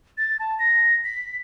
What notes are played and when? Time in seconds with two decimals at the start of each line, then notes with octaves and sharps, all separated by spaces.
0.18 A6
0.40 A5
0.59 A#6
1.04 B6